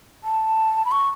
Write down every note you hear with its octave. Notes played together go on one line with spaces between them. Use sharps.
A5
B5
C#6